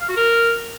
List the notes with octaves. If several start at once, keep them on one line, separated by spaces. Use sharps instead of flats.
F5
F#4
A#4